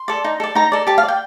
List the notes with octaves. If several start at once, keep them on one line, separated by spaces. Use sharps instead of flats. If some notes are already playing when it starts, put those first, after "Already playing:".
Already playing: C6
A4 D5
D#4
A4 D5
D#4 A#5
A4 D5
G4 A5
F5
D5
G5